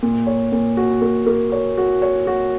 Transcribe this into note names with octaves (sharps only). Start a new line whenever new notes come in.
A#2
C#5
A#2
F#4
A#3
A#3
C#5
F#4
C#5
F#4